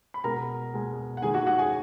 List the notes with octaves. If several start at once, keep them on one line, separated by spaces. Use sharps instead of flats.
B5
B2 G#3 B3 A#4 A#5
B2 G#3 B3
F#5
D#3 G#3 D#4 G#4 G#5
F#4 F#5
F#4 F#5
G#4 G#5